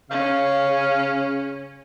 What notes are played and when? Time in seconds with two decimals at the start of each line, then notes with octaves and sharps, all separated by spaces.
0.11 C#3 C#4 F5